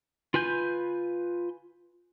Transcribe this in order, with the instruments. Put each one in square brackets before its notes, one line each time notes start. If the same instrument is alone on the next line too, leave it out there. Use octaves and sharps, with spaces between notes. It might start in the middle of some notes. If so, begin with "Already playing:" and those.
[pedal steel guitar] F4 B4 G#5 G6